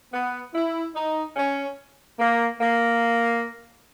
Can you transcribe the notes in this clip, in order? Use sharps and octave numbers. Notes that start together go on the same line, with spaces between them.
B3
E4
D#4
C#4
A#3
A#3